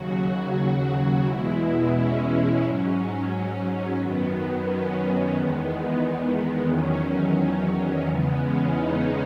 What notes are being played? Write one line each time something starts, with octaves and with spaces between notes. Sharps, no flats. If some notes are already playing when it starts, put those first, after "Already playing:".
Already playing: D#2 C#3 F#3 F#4
F#4
E2 B2 G#3 E4
C#4
G#2 F#3 C#4
C#4
F#2 D#3 F#3 B3
C#4
B3
E2 D#3 G#3
E2 D#3 F#3 C#4
E2 C#3 G#3 B3
C#4
D#4